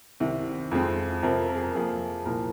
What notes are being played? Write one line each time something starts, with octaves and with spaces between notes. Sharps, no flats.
C2 C3 D#3
F2 F3 G#3 C4
F2 C3 F3 A#4
A#4
G#4
A#4
F2 F3 A#3 G#4
C2 A#2 F3 A#4